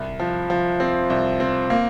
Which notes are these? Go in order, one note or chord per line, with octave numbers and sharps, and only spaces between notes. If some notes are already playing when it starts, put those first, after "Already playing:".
Already playing: C2
F3
F3
C4
C2
C4
A#3